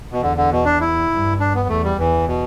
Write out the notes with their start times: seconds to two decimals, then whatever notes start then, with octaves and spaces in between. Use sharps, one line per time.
0.12 B2
0.21 E2 D3
0.37 D3
0.51 B2
0.65 D4
0.81 E4
1.11 G2
1.40 D4
1.54 B3
1.69 E2 A3
1.84 G3
1.99 E2 E3
2.27 B2